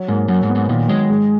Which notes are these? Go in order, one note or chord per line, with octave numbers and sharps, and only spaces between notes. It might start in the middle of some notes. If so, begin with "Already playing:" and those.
Already playing: F#3
G#2 A#3
F#2 F#3
G#2
B3
G#2
A#2 D#3
F#3 G#3
G#2